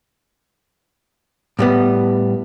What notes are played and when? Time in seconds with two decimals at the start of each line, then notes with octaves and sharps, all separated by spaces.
1.59 A2 G3 B3